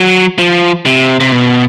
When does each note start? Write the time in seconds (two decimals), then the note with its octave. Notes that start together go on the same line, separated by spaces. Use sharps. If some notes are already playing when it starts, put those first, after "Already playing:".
Already playing: F#3
0.39 F3
0.86 C3
1.20 C3
1.32 B2